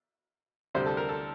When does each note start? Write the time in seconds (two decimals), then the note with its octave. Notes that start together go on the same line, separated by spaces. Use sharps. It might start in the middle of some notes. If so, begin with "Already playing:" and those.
0.74 D2 C3 G3 C5
0.86 A4
0.97 A#4
1.09 A4